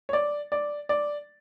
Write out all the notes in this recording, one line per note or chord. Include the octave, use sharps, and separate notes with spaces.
C#5
D5
D5
D5